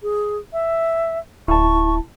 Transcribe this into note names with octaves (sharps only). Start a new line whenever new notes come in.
G#4
E5
D1 E4 A5 C#6